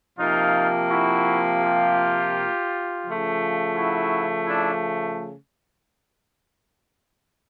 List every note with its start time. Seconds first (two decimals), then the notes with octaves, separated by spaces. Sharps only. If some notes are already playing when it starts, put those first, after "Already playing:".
0.19 C3 F3 A#3 D#4 F4
0.90 E4 F#4
1.62 F4 G4
3.05 C#3 F3 A3
3.75 E4 F#4
4.47 D4 E4